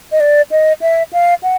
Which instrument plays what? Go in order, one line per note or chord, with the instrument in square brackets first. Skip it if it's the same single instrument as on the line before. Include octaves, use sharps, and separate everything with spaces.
[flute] D#5
D5
D#5
E5
F5
F#5